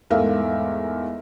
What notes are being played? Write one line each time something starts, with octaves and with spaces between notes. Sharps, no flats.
E2 G#2 A3 A#4 E5 F5